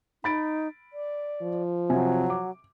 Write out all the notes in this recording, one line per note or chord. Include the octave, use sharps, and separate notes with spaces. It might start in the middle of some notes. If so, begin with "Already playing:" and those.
D#4 B5 A6 D7
D5
F3
C3 F#3 G#5
D6